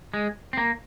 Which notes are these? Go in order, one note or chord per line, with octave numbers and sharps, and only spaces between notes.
G#3
C4
A#3